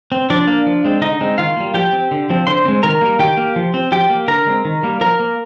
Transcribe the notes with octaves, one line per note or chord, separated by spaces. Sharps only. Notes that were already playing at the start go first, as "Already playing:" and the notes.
C4
F3 D4 D5
A#3
F3
G#3 C4
D3 D#4 D#5
G#3 C4
D#3 F4 F5
G3 A#3
F3 G4 G5
C4
D3
F3 C4
D3 C5 C6
G#3 C4
D#3 A#4 A#5
G3 A#3
D#3 G4 G5
A#3
F3
C4
F3 G4 G5
A#3
D3 A#4 A#5
G#3 C4
D#3
G3 A#3
F3 A#4 A#5
A#3